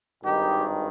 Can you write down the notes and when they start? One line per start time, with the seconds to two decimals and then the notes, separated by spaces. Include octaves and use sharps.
0.24 G#1 G2 D#3 D#4 G4